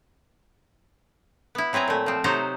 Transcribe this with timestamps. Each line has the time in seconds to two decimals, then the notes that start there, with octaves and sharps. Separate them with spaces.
1.55 B3 E4
1.73 F#3 C4 B4 G#5 A#5
1.88 A#2 A3
2.06 F3 C4
2.24 C3 F#3 D#4 F#4 C5 A#5